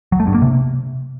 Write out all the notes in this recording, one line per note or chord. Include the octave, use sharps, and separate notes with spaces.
F#3
A3
G2
A#3
C3